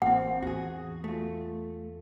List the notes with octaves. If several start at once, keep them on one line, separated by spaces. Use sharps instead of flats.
A1 A#3 C4 F#5
E2 F#4 G#4
A3 F4